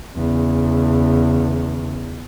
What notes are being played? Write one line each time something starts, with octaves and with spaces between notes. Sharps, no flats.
E2 C#3